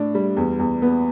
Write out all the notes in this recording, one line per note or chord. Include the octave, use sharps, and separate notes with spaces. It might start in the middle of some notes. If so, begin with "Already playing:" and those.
Already playing: A2 D4
G3
E2
E2
B3